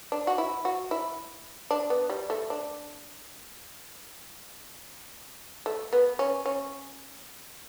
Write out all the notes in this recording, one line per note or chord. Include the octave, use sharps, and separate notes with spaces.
D4
F#4
E4
F#4
E4
D4
B3
G3
A3
D4
A3
B3
C#4
C#4